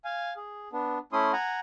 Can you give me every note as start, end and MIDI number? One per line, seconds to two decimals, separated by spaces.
0.05 0.33 77
0.05 0.33 80
0.36 0.69 68
0.73 0.98 59
0.73 0.98 62
1.12 1.32 57
1.12 1.32 61
1.12 1.32 64
1.12 1.32 84
1.12 1.32 87
1.33 1.60 78
1.33 1.60 80
1.33 1.60 82